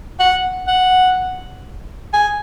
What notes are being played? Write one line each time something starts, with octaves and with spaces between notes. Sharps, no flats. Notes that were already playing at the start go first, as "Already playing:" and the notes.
F#5
F#5
G#5